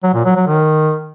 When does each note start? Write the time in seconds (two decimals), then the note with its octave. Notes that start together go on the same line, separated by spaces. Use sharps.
0.03 F#3
0.14 A#2
0.25 F#3
0.36 F#3
0.47 D#3